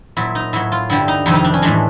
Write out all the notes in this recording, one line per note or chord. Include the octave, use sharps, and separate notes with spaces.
A#2 F#3 E4
D#4
A2 F#3 E4
F4
G2 D3 G3 E4
D#4
F2 C3 D#3 G3 E4
D#4
D4
C#4
A2 E3 G#3 D4